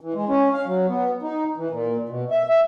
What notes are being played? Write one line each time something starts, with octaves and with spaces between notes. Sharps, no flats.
E3
G#3
C#4
F5
F#3
B3
D#4
E3
A#2
B2
E5
E5